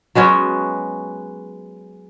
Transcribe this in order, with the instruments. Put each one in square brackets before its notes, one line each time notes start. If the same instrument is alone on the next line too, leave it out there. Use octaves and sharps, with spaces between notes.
[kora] F#3 G#3 B3 C#4